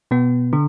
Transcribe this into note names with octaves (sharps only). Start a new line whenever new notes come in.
B2 B3
D3